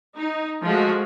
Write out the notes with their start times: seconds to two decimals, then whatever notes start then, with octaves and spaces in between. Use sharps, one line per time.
0.16 D#4
0.64 F3 G#3 A3 F#4